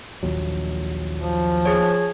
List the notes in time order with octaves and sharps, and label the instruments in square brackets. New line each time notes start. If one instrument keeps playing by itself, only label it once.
[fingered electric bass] A#1 D#2 F#3
[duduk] F3
[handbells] G#4 C#5